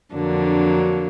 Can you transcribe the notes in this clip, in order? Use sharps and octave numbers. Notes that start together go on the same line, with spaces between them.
F2 D3 F#3 A#3 D4